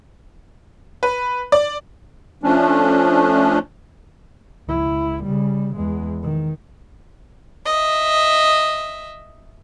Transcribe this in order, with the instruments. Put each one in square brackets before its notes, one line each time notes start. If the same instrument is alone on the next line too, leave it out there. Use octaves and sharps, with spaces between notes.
[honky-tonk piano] B4
D5
[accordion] F3 A3 C#4 D4
[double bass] C#2 E4
C#3 G3
E2 G#3
D#3
[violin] D#5 E5